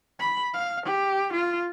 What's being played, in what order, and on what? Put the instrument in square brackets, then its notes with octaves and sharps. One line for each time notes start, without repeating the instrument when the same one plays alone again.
[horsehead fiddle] B5
F5
G4
F4